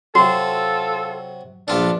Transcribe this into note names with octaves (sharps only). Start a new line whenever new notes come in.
C3 F#3 F4 F#4 A4
A#1 B3 D4 F4 A4